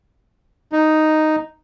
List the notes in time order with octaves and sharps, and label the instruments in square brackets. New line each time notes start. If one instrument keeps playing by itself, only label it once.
[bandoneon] D#4